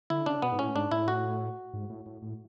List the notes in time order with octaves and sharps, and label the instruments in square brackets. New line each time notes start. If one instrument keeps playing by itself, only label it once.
[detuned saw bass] D3 [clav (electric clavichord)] E4
[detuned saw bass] C#3 [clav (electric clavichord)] D4
[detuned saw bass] B2 [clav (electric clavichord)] B3
[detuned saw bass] G#2
[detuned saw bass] A2 [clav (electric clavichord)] C#4
[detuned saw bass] G#2 [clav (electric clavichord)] D4
[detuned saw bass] A2 [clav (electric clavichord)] E4
[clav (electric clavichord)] F#4
[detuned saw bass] G#2
A2
A2
A2